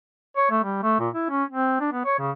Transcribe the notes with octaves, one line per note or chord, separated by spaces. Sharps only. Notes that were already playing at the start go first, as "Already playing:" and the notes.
C#5
A3
G3
A3
A#2
E4
C#4
C4
D4
B3
C#5
C#3